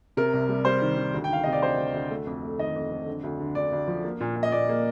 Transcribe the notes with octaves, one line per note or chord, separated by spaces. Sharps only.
C3 A#4
C2
G3
G3 C5
D#3
D#3
D2
G5
D#3 F5
C3 D#5
D5
D2 C5
D2
D2
A3
F2
A3
D#3 D#5
F2
F2
D3
D2
D3
D2 D5
D2
F3
A#3
A#2
A#2
D#5
A#2 D5
A#3